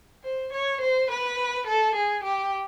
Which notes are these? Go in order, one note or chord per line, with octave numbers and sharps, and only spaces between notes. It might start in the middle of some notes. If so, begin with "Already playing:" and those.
C5
C#5
C5
B4
A4
G#4
G4